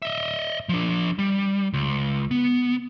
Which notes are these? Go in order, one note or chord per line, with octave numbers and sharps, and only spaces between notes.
D#5 E5
F3 D4
G3
C#2
B3